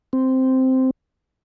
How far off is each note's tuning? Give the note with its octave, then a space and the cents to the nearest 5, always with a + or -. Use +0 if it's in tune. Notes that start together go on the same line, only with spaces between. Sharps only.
C4 -5